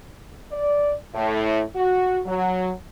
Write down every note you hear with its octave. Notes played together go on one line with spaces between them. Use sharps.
D5
A2
F#4
F#3